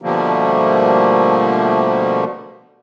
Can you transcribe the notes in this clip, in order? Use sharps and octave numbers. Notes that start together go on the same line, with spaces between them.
B2 D3 F3 G3 A3 A#3